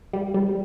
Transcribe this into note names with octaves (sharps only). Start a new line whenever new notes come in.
G3
G3